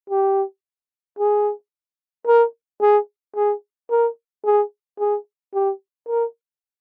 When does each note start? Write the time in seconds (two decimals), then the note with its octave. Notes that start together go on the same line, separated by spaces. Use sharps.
0.10 G4
1.19 G#4
2.27 A#4
2.81 G#4
3.36 G#4
3.90 A#4
4.45 G#4
4.99 G#4
5.54 G4
6.08 A#4